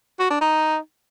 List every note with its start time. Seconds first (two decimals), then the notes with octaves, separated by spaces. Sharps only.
0.19 F#4
0.30 D4
0.41 D#4